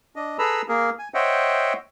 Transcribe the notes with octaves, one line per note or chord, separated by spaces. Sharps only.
D4 D#5
G#4 A4 B4 A#5 B5 E6
A#3 G#4 A#4
G#5
C5 C#5 D#5 E5 F#5 G5